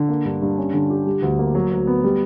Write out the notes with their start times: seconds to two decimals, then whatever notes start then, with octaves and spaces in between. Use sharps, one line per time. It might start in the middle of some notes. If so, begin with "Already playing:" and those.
Already playing: D3
0.09 A#3
0.25 G2
0.42 G2
0.58 C#4
0.74 D3
0.90 G4
1.06 G3
1.22 D2
1.39 A#3
1.55 F#3
1.72 D2
1.87 B3
2.04 G3